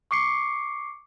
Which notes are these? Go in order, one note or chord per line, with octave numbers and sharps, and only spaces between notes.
C#6 D6 C7 C#7